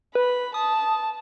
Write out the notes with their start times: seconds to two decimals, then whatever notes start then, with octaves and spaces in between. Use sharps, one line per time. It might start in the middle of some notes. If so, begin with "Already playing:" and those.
0.15 B4 B5
0.54 A5 D#6